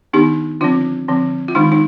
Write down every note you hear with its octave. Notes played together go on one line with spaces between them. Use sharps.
D#3 B3 D4 D#4 G4
D3 F3 C4 D4 F4
D3 F3 C4
F4
D#3 G#3 D4 D#4
D#4